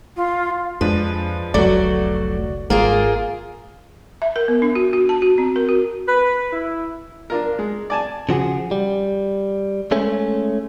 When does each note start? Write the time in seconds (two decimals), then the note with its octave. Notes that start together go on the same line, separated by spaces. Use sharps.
0.16 F4
0.81 F2 F3 G#3 D4 B4
1.54 F1 C2 D3 F#3 A3 F#4 D5
2.70 G#1 A#3 F4 G#4 A#4
4.22 E5
4.36 A#4
4.48 B3
4.62 D4
4.75 F#4
4.93 F#4
5.09 A5
5.22 F#4
5.38 C4
5.56 A#4
5.69 F#4
6.07 B4
6.53 E4
7.30 D4 F4 A#4
7.59 G#3
7.90 D5 G#5 A5
8.29 C#3 F3 F#4 G#4
8.71 G3
9.91 G#3 A3 C#4